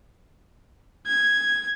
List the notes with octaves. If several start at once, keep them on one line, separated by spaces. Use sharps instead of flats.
G#6